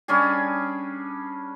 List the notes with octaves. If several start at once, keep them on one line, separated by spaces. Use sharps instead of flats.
G3 C#4 D4 G#4